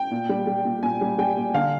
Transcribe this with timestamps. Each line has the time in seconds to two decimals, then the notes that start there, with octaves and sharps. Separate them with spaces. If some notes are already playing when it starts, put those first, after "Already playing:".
Already playing: G5
0.11 A#2
0.29 G3
0.47 G3
0.65 A#2
0.83 A#2 G#5
1.01 G3
1.18 G3 G5
1.36 A#2
1.54 D3 F5